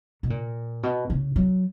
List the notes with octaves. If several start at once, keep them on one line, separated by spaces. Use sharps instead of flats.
B2
A#2
B2
C#3
F#3